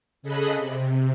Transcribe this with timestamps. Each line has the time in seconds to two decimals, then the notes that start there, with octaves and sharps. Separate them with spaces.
0.22 C#3 G#4 A4 D#5 B5 F#6
0.55 C3